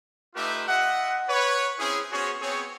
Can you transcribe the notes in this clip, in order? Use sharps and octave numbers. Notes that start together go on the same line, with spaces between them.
A3 D#4 F4 G4 B4 E5
F4 D#5 E5 F#5
B4 C#5
C4 C#4 E4 G#4
B3 C#4 F#4 G#4 C5 C#5
B3 C4 G#4 C#5